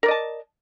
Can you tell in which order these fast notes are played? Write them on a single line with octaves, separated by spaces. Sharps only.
A#4 D5 D#5 A5